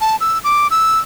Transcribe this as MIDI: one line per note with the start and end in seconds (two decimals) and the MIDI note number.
0.01 0.16 81
0.21 0.39 88
0.44 0.67 86
0.71 0.99 88